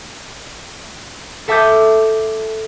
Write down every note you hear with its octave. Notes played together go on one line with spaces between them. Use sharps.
A4 E5 A5 D6 D#6 G6